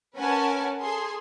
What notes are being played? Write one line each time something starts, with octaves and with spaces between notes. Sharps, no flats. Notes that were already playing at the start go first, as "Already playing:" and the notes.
C#4 A#4 B4 F#5 G#5 A5
G#4 A4 C6